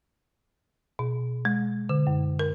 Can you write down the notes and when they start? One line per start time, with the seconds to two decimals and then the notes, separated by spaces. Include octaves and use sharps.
0.99 B2
1.45 G#3
1.89 D3
2.07 F#2
2.39 A#4